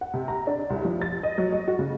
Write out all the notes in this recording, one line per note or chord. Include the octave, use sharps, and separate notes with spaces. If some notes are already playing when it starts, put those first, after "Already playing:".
F#5
C3
A#5
D4
C2
F3
A6
D#5
F#3
D#5
F#4
C#3